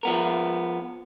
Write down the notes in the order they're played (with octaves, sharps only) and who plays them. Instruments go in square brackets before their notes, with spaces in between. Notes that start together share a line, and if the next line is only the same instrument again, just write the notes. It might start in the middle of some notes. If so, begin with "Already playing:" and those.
[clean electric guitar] F3 B3 A#4